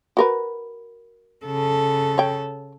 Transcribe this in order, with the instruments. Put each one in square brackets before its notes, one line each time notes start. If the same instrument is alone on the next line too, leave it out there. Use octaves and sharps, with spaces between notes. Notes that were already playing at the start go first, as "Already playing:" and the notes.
[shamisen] F#4 A#4 B4
[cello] C#3 A4
[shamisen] C#5 G5